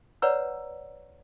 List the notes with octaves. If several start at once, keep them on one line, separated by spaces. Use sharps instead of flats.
B4 C#5 D5 F#5 A#5 E6